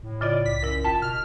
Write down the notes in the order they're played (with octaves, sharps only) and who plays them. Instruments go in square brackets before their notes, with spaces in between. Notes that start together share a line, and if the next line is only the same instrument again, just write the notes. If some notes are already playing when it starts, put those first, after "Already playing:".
[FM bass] A2
[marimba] C#3 F4 D#5 [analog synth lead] D5
[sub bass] C2 [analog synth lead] B6
[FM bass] F#2 [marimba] E4 A#4
[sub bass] G#1 [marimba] F4 G5 [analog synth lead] A5
[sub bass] D1 [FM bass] B2 [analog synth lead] F6